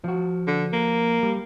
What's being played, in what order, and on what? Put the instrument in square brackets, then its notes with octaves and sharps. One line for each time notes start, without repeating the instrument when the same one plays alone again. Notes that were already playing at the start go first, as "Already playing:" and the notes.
[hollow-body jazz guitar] F3 F#4
[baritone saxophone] D3
A#3
[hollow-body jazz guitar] G3